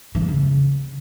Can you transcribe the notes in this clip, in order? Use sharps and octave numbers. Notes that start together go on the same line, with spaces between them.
E3
G2
C#3